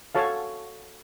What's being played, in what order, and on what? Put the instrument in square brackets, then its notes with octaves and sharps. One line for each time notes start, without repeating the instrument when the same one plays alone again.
[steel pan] F#4 A4 C#5 F5 A5